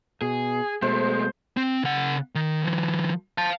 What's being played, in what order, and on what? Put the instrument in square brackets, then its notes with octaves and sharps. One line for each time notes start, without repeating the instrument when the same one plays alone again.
[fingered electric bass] B2 [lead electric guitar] G#4
[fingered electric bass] B2 [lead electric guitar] G#3 A3 [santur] C5
[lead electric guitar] C4
C#3 F#5
D#3
D#3 F3
F5 A5